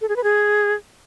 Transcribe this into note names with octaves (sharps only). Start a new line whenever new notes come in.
A4
G#4
B4
G#4